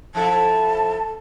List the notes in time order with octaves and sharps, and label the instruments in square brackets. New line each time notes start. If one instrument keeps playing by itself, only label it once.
[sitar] F3 E4 A4 [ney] A5